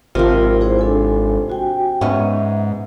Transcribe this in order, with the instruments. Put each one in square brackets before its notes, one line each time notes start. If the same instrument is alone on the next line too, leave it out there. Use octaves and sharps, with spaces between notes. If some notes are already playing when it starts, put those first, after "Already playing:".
[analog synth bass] G#1 [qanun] C3 F3 [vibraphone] F4 A#4
[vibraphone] E4 G#4 C5
D4 A4 G#5
F#4 G5 G#5
[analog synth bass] G#2 [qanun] B3 C#4 [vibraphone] E5